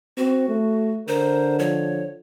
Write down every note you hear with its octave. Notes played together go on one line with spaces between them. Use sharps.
C4 F#4
A3
D3 A#4 C5
F3 C#5